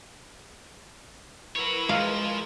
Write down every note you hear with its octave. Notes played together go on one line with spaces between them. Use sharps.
E4 F#4 A#4 B4 C#5
F3 G#3 F5